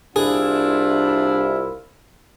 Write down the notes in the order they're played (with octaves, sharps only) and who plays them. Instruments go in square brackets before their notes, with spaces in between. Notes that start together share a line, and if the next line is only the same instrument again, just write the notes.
[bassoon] C2 [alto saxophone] D4 [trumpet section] E4 F4 [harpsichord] G#4